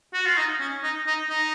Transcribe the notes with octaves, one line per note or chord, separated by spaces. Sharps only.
F#4
F4
D#4
C#4
D#4
D#4
D#4